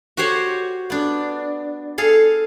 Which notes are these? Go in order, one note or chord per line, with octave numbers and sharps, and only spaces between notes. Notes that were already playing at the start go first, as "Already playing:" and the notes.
F#4 G4 C5 C#5 F#5
B3 D4
G#4 A4 F5